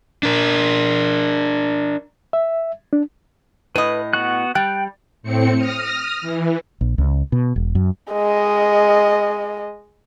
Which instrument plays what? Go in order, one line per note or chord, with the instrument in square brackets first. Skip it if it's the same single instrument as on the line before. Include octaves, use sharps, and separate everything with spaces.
[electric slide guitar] D4 A#4
[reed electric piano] E5
D4
[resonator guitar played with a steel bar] A2 D#5 [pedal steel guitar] B4
[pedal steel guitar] B3 F#4 F#6
[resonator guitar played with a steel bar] G3 [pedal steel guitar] G5 F#6
[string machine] A2 C4 C#7
D#6 F6 A#6
E3
[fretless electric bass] A#1
C#2
B2
E1
F#2
[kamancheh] G#3 D#5